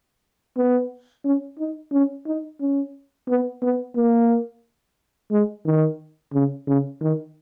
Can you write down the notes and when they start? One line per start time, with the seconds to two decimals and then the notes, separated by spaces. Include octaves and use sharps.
0.57 B3
1.25 C#4
1.58 D#4
1.93 C#4
2.27 D#4
2.60 C#4
3.28 B3
3.62 B3
3.96 A#3
5.31 G#3
5.65 D#3
6.33 C#3
6.67 C#3
7.01 D#3